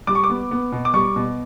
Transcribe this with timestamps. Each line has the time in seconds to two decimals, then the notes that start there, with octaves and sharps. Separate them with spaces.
0.07 G3 D6
0.15 C#6
0.24 D6
0.29 B3
0.51 B3
0.72 B2
0.85 D6
0.94 G3 C#6
1.16 B2